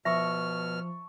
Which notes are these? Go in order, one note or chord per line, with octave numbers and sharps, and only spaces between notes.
B2 F3 E5 A5 C#6 E6 F6